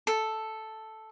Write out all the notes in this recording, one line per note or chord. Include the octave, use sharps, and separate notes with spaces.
A4